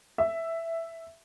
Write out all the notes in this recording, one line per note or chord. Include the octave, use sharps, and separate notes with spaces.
E5